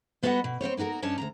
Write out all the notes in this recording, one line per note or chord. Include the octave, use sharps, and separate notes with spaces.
G3 B3 F#4 B4 D#5 F#5
B2
C4 C#4 C5 C#5
A#3 D#4 F#4 A4 A#4
G2 C#4 D4 C#5 D#5 A5
D2 B2 A#5